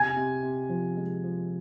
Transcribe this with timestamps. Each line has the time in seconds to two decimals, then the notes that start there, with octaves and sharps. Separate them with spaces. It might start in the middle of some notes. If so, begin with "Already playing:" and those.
Already playing: C3 G#5 G#6
0.17 C3
0.43 C3
0.70 F3
0.97 G#3
1.24 F3